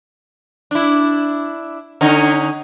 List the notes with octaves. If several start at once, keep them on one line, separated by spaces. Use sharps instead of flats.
D4 E4
D3 C#4 D#4